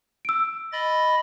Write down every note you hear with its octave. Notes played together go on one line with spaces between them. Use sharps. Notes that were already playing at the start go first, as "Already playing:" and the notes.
E6 D7
D#5 B5 A6